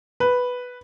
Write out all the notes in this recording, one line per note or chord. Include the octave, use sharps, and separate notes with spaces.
B4